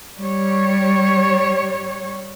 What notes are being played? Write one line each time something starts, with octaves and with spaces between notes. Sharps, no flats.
G3 C#5